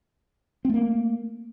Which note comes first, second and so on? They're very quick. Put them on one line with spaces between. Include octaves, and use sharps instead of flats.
C4 A3 A#3